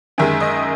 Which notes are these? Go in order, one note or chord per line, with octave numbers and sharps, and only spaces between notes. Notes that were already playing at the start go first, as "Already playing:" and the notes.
F#2 D#3 G#3 E5
D#5